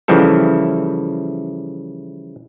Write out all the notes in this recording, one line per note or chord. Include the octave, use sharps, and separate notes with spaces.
C#3 E3 F3 G3 E4 A4